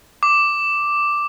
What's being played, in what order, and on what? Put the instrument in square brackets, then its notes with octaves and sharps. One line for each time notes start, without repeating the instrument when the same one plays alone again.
[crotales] D6